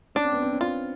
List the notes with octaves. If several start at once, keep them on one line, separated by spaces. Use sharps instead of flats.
C#4 D4
C4
B3
C4
C#4
D4 F4